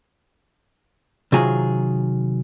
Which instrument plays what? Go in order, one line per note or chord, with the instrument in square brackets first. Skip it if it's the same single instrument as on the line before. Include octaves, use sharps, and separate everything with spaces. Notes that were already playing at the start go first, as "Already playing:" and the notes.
[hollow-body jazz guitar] C3 D#3 F#3 F4 G#4